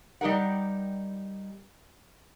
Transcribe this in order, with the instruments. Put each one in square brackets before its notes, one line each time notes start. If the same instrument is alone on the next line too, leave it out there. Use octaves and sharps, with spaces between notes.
[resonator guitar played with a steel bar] G3 D#4 G4 A#4 F#5